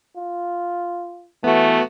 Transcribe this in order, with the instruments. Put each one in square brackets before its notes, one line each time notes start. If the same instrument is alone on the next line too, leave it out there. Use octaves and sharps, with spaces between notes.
[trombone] F4
[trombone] E3 [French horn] A3 [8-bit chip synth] B3 F#4